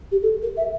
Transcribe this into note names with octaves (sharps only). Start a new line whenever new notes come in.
G4
A4
A#4
E5